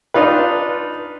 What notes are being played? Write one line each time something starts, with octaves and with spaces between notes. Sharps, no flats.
D4 D#4 F4 B4